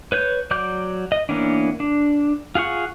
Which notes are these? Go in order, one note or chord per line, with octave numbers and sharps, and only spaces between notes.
B4 C#5 G6
F#3 D5 D6 G6
D#5
E3 A#3 B3 C#4 D4
D4
F4 G#4 F#5 C#6